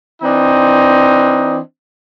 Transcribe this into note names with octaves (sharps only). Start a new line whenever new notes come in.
E3 C4 D4 D#4